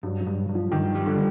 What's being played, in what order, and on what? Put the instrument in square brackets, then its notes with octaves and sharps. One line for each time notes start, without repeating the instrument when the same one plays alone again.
[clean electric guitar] G2 [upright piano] F#3
[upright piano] F#3
[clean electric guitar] G2
G2
[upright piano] F3
[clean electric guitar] G2 [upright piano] D#3
[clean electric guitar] G3
[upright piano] D3